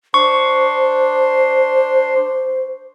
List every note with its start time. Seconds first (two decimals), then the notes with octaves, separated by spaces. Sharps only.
0.14 D4 C5 C6 C#6